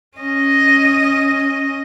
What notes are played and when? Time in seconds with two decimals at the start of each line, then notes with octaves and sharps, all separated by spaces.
0.17 C#4 D#5